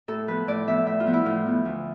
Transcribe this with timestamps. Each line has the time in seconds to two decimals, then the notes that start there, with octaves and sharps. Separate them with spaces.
0.08 A2 A4
0.27 F3 B3 B4
0.47 A2 D5
0.67 F3 B3 E5
0.86 A2 E5
1.00 F4
1.07 F3 B3
1.13 E4
1.26 A2 F4
1.46 F3 B3
1.65 D2